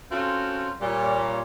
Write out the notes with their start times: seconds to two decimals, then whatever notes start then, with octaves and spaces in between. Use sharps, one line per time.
0.11 C4 C#4 F4 F#4 A4 A#4
0.80 A#2 G3 C#5